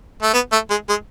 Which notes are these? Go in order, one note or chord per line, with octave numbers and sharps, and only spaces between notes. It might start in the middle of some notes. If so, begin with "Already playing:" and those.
A3
B3
A3
G#3
G#3